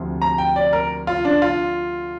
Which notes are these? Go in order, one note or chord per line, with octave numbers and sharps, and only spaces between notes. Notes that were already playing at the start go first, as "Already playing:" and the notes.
Already playing: D2 C3 F3
A#5
G5
D5
A#4
F4
D4
F4